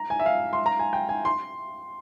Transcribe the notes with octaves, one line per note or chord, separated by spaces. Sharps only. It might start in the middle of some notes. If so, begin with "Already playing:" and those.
Already playing: A#5
G#5
E5
F5
C6
A#5
G#5
G5
G#5
C6